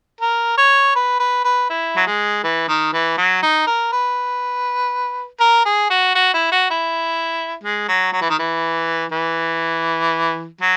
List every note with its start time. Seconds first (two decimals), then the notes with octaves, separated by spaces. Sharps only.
0.21 A#4
0.58 C#5
0.95 B4
1.20 B4
1.44 B4
1.69 E4
1.96 F#3
2.06 G#3
2.44 E3
2.68 D#3
2.93 E3
3.17 F#3
3.43 D#4
3.67 A#4
3.92 B4
5.40 A#4
5.65 G#4
5.90 F#4
6.15 F#4
6.33 E4
6.52 F#4
6.70 E4
7.63 G#3
7.88 F#3
8.13 F#3
8.21 E3
8.30 D#3
8.39 E3
9.12 E3
10.61 F#3